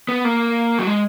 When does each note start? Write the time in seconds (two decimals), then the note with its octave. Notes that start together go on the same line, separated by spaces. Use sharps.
0.09 B3
0.25 A#3
0.79 F#3
0.87 G#3